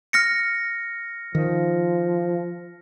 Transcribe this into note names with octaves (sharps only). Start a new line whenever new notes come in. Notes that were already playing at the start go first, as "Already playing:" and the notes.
F6 A#6 C#7
D#3 F3